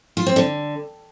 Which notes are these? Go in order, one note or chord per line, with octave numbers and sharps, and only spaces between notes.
F4
C4
D3